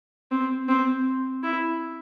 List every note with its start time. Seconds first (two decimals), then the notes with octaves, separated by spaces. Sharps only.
0.31 C4
0.68 C4
1.44 E4